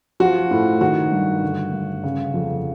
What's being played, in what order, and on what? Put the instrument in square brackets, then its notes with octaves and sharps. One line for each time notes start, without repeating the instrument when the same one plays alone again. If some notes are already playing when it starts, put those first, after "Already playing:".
[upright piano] F3 F#4
A2
D#3 F#4
G2
D3
G2
C#3
F2